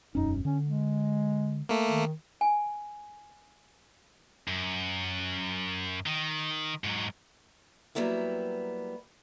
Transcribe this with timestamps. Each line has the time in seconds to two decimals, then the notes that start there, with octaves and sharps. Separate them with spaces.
0.15 E1 F#2 C#4 D#4
0.45 D3 C#4
0.65 G#3
1.69 A3 A#3
1.88 D#3
2.41 G#5
4.48 F#2
6.06 D#3
6.84 G#2 F#3
7.95 F#3 G3 A#3 B3 E4